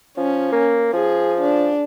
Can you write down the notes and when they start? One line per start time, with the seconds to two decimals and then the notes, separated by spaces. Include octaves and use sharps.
0.17 F3 C#4
0.52 A#3
0.93 F3 G#4
1.41 D4